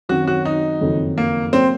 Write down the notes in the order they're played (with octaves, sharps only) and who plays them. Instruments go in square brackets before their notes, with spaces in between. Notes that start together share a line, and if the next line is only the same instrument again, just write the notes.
[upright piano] F#2 D#3 F#3 C4 [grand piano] F#4
[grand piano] F#4
D#4
[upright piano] F#1 F2 D#3 F#3
[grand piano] A#3
[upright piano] F#3 A#3 [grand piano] C4